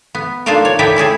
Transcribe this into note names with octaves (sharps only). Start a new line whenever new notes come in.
B3
A#3 D4 D#4 F4 A4 A#4
C#5
D#4 E4 A4 D5 E5 G5
C#4 E4 G#4 A4